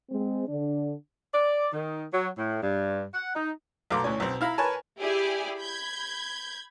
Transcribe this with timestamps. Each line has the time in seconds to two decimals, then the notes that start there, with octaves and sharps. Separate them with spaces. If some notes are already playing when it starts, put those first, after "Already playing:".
0.10 G#3 C4
0.48 D3 D4
1.34 D5
1.73 D#3
2.14 F#3
2.38 A2
2.63 G2
3.14 F#5
3.35 D#4
3.91 B1 A3 F5 A#5 C6 D6
4.04 D2 A2 C#4
4.20 B1 C4
4.41 E4 F5 A#5 B5
4.58 A#4 B4 C#5 G#5 A5
5.00 E4 G4 G#4 D5 G#5
5.59 B5 G6 G#6